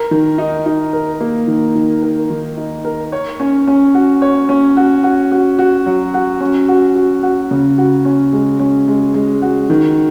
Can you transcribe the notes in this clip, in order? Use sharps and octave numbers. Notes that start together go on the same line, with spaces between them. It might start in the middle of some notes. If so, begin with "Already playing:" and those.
Already playing: A#4
D#3
D#4
D#4
A#4
A#3
D#3
D#3
A#4
D#3
D#4
A#4
C#5
C#4
C#4
F#4
C#5
C#4
F#4
F#4
F#4
F#4
F#3
F#4
C#4
F#4
F#4
F#4
C#3
F#4
C#4
G#3
C#4
G#3
G#3
F#4
D#3